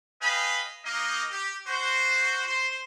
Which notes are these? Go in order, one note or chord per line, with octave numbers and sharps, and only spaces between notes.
B4 D#5 F5 G5 G#5 B5
A#3 D#4 D#5
G4
F#4 C5
C5 C6